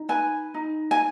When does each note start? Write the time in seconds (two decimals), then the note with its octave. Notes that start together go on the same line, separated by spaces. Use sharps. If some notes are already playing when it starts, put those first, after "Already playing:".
Already playing: D#4
0.09 B4 G#5
0.54 D#4
0.91 G#5